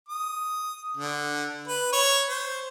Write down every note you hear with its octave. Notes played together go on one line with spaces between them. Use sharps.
D#6
D3
B4
C#5
C5